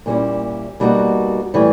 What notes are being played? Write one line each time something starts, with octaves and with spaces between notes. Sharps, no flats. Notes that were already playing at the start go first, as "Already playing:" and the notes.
A#2 G3 A#3 C#4 E4
B2 G3 A#3 D#4 F#4
A2 E3 G3